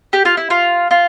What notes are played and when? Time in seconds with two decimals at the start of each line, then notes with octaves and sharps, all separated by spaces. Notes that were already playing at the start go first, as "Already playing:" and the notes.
0.13 G4
0.25 F4
0.37 E4
0.50 F4
0.91 F4